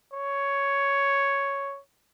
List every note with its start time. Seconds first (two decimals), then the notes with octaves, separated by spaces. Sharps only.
0.13 C#5